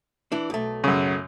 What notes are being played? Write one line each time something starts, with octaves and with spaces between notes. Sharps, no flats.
E3 D4
B1 A3
F#2 C#3